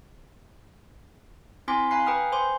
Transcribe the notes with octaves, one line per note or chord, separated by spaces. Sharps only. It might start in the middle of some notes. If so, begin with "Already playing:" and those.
C4 E4 G#5 C6 D6 B6
F5 G#5 A#5 B5 F#6 C7
B4 G5 B5 D#6 F6
C5 G#5 C6 D6